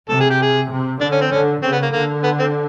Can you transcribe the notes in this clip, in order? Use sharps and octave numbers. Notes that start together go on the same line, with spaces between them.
C3 A4
G#4
G4
G#4
C3
D3 D4
C#4
C4
D3 C#4
C#3 C4
B3
A#3
D3 A#3
B3
C4